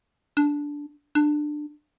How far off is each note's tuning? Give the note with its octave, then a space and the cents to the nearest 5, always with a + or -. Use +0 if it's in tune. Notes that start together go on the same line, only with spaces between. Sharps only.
D4 -10
D4 +20